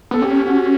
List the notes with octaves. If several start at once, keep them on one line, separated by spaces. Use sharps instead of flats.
B3 A4
C#4 G4
F#4